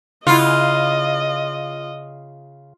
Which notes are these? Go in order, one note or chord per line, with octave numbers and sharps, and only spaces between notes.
C#3 E4 F4 D#5 F#5